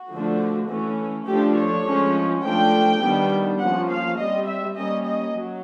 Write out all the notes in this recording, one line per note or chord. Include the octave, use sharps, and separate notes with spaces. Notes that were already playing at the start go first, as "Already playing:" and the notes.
Already playing: F#4
D3 F3 A3 D4
E3 A3 C#4
F3 A3 D4 G4
C#5
F3 G#3 C#4
F3 A3 D4 G5
D#3 G3 B3 D4
F3 A#3 C#4 F#5
F5
G3 C4 D#5
E5
G3 A#3 C#4 D#5
D#5
F#3